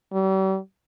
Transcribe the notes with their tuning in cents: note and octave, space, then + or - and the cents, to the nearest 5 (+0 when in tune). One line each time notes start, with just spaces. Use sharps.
G3 -40